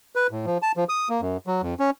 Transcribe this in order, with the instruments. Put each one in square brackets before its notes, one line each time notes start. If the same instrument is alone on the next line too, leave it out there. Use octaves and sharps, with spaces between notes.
[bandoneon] B4
A2
F3
A5
F3
D#6
A#3
F#2
F#3
F2
C#4